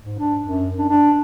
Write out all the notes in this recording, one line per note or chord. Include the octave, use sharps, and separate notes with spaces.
G#2
D4
F#2
D4
D4